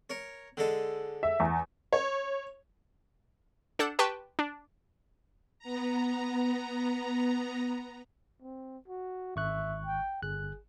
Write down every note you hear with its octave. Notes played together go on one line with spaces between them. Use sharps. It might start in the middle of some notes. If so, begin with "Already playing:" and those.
A#4 C#5
D3 G#3 A4
E5
E2
C#5
D4 A4 F#5 G6 E7
G4 B4 G5 A5 C6 C#6
D4
B3 A#5
C4
F#4
G#1 E5 C#6 F#6
G5
G1 G#4 F#6